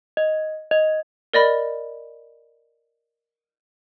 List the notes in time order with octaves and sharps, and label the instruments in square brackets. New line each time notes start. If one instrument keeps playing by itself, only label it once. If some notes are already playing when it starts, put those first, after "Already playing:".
[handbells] D#5
D#5
[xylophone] A#4 D5 D#5 B5